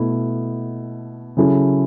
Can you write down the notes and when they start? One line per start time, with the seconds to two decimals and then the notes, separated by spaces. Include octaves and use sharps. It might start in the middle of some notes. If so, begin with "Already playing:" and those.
Already playing: B2 A3 E4
1.37 C#3 F#3 C#4 E4 A4